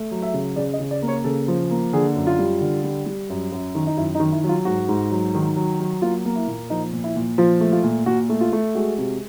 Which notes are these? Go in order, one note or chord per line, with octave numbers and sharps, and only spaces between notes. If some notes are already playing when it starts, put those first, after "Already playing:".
Already playing: A3
F#3
E5
C#3
C#3 D5
D#5
C#3
D5
A#3
C#5
C#3 A4
F3
A#3
D3 G#4
F#2
F4
G3
D3
G3
G3
F#2
F#2
D#3
D#4
F#2 E4
D#4
D#3
E4
F#3
F4
G#2 F#4
G#2
F#3
D#3
F#3
F#3
A#3 F4
A#3
E4
A#2
F3 D#4
A#2
E4
A#2
F3 F4
A3
F4
A#2
A#2 F#4
A3
F4
A3
G#3 F#4
C3